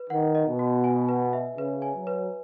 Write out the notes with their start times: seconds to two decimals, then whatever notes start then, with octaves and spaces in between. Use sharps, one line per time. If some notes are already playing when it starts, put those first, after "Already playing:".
Already playing: B4
0.10 D#3 F#5
0.35 D#5
0.47 B2
0.59 F#4
0.84 G#5
1.09 B4
1.33 E5
1.58 C#3 B4
1.82 G#5
1.95 F#3
2.07 B4